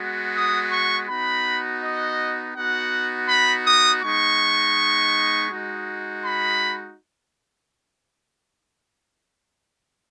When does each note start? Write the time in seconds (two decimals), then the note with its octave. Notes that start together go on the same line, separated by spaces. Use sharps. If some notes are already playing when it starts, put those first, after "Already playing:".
Already playing: G#3 B3 F#4
0.35 D#6
0.71 C#6
1.08 B3 D#4 F#4 B5
1.82 D#5
2.55 B3 D#4 F#4 F#5
3.29 B5
3.66 D#6
4.02 G#3 B3 D#4 C#6
5.50 G#3 D#4 F#4
6.23 B5